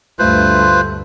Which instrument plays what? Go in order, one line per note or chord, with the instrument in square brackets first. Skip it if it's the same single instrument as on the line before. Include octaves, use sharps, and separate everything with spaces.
[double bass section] D2 G2 A3 [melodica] F4 B4 C5